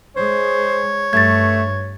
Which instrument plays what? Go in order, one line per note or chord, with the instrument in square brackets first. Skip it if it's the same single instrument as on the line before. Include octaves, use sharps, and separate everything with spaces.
[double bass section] G#3 [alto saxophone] C5 [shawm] C#5
[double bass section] G2 [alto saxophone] A3 [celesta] G#6 A6